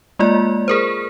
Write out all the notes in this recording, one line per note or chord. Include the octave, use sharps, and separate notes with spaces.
G#3 A#3 F4 D5
G#4 A#4 C5